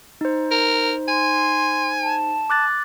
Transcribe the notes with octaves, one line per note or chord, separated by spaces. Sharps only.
D#4 C5
A#4
G#5 C6
A5
D6 F#6 A6